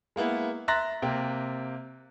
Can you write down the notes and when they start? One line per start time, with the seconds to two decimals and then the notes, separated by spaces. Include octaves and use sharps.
0.16 G#3 A#3 B3 E4
0.68 E5 A#5 C6 F#6 A6 A#6
1.02 C3 A#3 G5